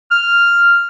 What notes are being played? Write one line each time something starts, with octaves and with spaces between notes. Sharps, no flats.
F6